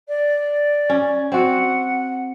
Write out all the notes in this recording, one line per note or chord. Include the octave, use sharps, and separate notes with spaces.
D5
C#4
C4 F#4 F#5